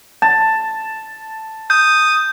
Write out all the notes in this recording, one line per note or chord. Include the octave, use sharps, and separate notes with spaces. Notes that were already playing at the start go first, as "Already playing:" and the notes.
A5
D#6 G6